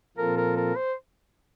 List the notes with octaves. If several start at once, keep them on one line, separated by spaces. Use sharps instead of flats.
A#2 F3 C4 F4 A4 A#4
A#4
A#4
C5